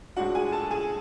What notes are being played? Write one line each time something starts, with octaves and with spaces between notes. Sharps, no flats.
A2 G#3 D4 F#4 F#5
G#4 G#5
A4 A5
G#4 G#5